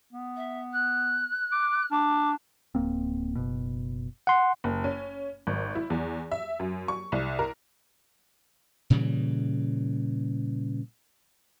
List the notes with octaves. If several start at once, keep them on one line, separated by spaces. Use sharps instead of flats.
B3
E5
F#6
D6
D4 D6
D1 A#3 C4
F#1 B2
F#5 C6
F#1
C#4
G#1
E4
E2
E5
F#2
C#6
C2
A#4
A#2 C#3 E3 G3